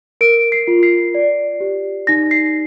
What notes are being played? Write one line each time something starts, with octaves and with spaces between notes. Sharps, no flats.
A#4 D7
C7
F4
C7
D5
G4
D#4 A#6
C7